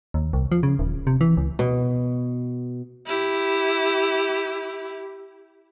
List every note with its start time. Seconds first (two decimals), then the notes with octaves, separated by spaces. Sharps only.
0.14 D#2
0.33 C2
0.52 F3
0.63 C#3
0.79 D#1
1.07 C3
1.21 E3
1.37 C#2
1.59 B2
3.07 E4 G4